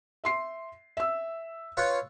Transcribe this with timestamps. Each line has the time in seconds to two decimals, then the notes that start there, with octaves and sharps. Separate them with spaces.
0.24 E5 C6 C7
0.97 E5 E6
1.77 F4 B4 C#5